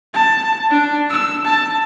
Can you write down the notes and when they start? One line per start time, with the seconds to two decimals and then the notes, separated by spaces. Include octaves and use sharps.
0.14 A5
0.70 D4
1.09 E6
1.45 A5